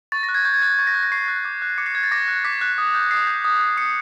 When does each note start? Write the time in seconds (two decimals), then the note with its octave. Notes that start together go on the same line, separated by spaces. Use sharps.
0.12 C#6 A6
0.23 A#6
0.29 F#6
0.34 G#6
0.45 C#6 G6
0.54 G#6
0.62 F#6 A6
0.70 G#6
0.79 C#6 A6
0.87 A#6
0.95 F#6
1.03 A#6
1.12 C#6 C7
1.28 F#6
1.45 D6
1.62 F#6
1.78 D6 C#7
1.86 C7
1.95 F#6 G#6
2.03 A6
2.11 D6 A#6
2.28 F#6
2.44 D6 B6
2.61 F#6
2.78 D#6
2.95 G6
3.11 D#6 C7
3.27 G6
3.44 D#6
3.60 G6
3.77 D#6 C#7